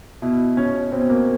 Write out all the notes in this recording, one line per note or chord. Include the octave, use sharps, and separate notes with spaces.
B2 E4
B2 C#4
B2 C4
A#3